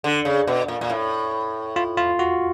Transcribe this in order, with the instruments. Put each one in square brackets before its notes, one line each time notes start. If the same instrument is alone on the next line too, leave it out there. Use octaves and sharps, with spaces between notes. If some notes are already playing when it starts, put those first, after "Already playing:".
[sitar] D3
C#3
B2
A#2
A#2
A2
[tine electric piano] F4
F4
F#4